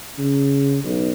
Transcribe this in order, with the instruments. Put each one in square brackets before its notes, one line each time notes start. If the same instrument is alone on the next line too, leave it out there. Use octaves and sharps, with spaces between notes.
[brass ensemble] C#3
B1